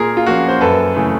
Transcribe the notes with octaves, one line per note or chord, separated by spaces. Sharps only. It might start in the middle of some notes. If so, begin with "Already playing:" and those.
Already playing: A#2 G#4 A#4
F4
F3 A#3 C#4 F#4
C5
F#2 A4 B4
C#3 E3 A3